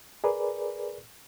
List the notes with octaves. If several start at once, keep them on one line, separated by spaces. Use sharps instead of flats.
G#4 A#4 B4 D5